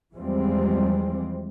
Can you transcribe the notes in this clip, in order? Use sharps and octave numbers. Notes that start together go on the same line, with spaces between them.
E2 E3 F3 G3 G#3 C4